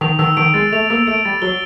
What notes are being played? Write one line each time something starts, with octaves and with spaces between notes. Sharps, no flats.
D#3 F7
D#3 E6
D#3 D7
G#3 A6
A3 F7
A#3 E6
A3 D7
G3 A6
F#3 G7